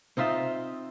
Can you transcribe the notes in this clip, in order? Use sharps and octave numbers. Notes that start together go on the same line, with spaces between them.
C4 D#4 F4 E5